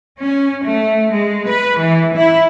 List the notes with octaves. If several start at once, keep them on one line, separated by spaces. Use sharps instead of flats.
C#4
A3
G#3
B4
E3
E4